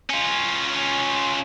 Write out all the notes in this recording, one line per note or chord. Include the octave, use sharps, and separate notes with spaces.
C#4 F4